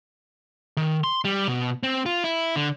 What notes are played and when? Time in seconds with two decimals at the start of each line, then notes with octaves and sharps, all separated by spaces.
0.77 D#3
1.04 C6
1.25 G3
1.47 B2
1.83 C4
2.06 F4
2.24 E4
2.56 D3